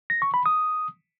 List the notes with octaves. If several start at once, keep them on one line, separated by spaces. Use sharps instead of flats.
A#6
C#6
B5
D#6